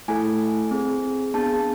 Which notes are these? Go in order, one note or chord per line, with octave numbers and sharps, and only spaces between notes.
A3 E4 A4 G#5
C4 G#4
B3 D4 G#4 A5